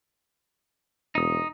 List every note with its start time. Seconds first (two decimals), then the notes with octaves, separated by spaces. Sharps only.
1.15 E1 D#4 D#6